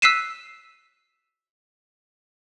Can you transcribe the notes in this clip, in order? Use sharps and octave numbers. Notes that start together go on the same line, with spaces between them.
E6 F#6 B6 C7 D#7 E7